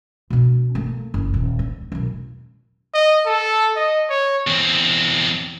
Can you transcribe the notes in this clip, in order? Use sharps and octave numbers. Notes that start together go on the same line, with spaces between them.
B2 D4
A3 A#3
F#1
D#1
D3
E1 F#2
D#5
A4
D#5
C#5
E2 C4